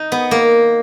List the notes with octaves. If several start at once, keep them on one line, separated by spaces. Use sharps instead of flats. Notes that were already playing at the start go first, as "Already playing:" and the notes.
Already playing: D#4
B3
A#3